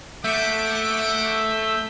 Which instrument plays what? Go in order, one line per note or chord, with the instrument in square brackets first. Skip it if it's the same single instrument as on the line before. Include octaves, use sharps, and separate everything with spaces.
[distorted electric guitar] A3 [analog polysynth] E5 G6 B6 [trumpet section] F#5 D6